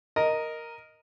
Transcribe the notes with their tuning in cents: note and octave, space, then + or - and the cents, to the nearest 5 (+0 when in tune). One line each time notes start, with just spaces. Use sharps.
A#4 +0 D#5 +0